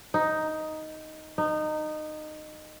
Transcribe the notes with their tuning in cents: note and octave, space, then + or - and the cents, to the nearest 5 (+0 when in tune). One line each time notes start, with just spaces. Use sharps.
D#4 +5
D#4 -20